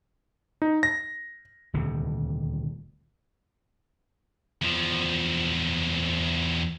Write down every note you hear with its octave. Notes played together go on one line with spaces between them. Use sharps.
D#4
A#6
D#1 D2 C3
E2 F3